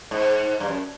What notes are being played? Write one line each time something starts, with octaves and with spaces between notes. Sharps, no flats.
G#2
G2
F#2